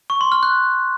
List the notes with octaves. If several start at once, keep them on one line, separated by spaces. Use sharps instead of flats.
C#6
C6
F6
F#6